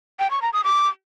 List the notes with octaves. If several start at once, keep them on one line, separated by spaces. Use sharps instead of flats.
G5
C#6
A#5
D#6
D6